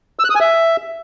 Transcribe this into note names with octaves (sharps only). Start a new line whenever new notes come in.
E6
F#6
D#6
G#5
E5